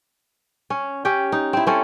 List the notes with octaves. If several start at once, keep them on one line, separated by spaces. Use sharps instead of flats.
C#4
C#4 G4 G5
D#4
C4 E4
C4 C#4 A4